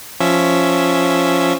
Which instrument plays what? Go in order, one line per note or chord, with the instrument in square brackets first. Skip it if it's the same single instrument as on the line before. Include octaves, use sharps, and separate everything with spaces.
[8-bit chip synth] F3 C#4 E5